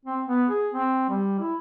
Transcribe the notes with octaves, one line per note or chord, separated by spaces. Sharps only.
C4
B3
G#4
C4
G3
E4